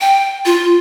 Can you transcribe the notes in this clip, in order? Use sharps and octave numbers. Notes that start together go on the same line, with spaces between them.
G5
F4